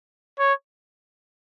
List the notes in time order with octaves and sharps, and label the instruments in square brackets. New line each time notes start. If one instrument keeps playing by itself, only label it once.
[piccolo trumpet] C#5